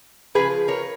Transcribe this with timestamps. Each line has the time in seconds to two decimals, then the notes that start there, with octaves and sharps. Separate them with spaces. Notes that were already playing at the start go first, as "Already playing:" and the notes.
0.35 C#3 F3 G#4 B4
0.68 A#4 C#5